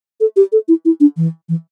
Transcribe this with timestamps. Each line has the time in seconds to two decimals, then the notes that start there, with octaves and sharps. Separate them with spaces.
0.20 A4
0.36 G4
0.52 A4
0.68 E4
0.85 E4
1.00 D4
1.17 E3
1.49 E3